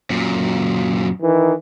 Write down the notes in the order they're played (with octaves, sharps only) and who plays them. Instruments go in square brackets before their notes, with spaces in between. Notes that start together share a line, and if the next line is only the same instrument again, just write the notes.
[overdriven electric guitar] F#2 A#2
[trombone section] D#3 E3